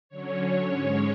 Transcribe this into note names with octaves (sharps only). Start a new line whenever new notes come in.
D3 F#3 C#4 C#5
C#5
G#2 G#3 C#4 C#5